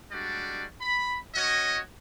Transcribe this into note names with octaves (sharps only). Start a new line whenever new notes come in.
G3 G#3 D4 F#4 D5
B5
C#4 F#4 C#5 D#5